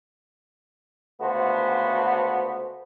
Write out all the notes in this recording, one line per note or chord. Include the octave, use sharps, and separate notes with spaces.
C#2 D3 A3 B3 F#4 C5